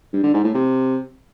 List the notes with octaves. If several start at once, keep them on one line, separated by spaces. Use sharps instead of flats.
G2
D3
G#2
A2
C3